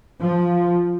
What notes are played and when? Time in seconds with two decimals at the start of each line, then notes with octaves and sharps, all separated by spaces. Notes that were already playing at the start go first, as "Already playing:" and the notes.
0.21 F3